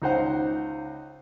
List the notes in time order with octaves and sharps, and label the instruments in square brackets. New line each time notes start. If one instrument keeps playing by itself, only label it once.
[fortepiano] C#2 D#4 C5 F#5